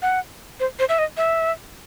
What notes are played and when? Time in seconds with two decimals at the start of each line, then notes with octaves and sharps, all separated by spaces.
0.02 F#5
0.60 C5
0.79 C5
0.89 E5
0.99 D#5
1.17 E5